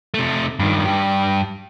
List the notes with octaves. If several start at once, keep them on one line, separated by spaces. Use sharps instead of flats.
C3 A3
G2 D#3
G2 G4